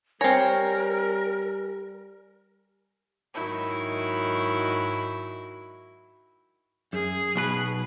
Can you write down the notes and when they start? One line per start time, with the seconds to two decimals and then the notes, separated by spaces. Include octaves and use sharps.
0.21 G3 C4 A#4 C#5 G#5 A#6
3.34 G#2 D#3 F#3 E4
6.93 F#2 G#4
7.36 B1 B2 B4